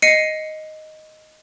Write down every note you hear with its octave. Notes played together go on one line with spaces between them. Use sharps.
D#5 C7 C#7 D#7